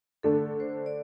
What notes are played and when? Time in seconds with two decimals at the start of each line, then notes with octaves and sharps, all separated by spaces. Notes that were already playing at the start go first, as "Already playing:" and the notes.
0.23 D3 A3 D4 A4
0.60 C5
0.86 D5